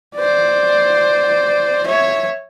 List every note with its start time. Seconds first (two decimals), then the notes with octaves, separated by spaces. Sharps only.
0.16 C5 D5
1.86 C#5 E5